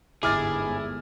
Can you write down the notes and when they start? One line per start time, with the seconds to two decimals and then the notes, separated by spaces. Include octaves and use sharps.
0.23 G1 D#2 G#2 E4 G#4 D6 F6 A6